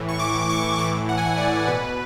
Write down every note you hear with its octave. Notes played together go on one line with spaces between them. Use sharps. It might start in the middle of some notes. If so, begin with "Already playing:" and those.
Already playing: A2 E3
C#6
D6
C#6
A2 E3 D6
F#5
G#5
F#5
D5
B2 B4